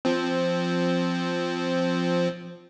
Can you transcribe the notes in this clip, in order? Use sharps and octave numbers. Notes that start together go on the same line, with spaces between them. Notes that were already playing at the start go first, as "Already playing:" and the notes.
F3 C4